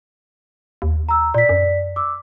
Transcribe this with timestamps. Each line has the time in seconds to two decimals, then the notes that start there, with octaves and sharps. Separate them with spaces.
0.82 D#2
1.09 A#5 E6
1.34 A#2 D5 B6
1.49 F#2
1.96 D6 E6